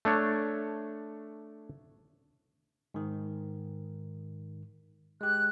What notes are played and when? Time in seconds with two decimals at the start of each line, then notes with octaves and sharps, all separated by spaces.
0.05 A3 D4 C#5
2.94 G#2 D#3
5.21 G#3 G4 F#6